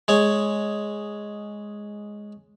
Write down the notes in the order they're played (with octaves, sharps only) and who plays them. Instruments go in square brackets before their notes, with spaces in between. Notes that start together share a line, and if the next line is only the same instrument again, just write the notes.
[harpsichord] G#3 C#5